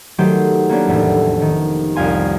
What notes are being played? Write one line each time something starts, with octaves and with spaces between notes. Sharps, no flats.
D#3 F#3 A3 G4 C5
A#3 B3 C#4 D4
F1 E2 A2 A5
D#3
C2 F2 C#4 F5 G#5 C6